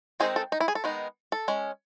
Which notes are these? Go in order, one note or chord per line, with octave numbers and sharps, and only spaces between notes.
D#3 G#3 C4 D#4 G#4
A4
D#4
E4
G#4
A4
D#3 G#3 B3 D#4
A4
G#3 C#4